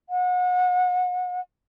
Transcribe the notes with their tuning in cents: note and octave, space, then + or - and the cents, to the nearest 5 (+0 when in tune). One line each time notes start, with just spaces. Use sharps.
F#5 -35